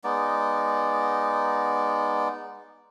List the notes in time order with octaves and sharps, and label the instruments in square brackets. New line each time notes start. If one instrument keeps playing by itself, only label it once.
[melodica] G#3 B3 D#4 D5